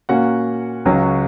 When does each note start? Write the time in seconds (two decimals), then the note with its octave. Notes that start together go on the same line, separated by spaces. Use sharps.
0.09 A#2 A#3 C#4 F#4 F#5
0.85 C#2 C#3 F#3 C#4